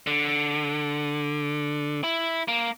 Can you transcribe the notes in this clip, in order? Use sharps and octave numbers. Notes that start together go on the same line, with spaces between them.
D3
E4
A#3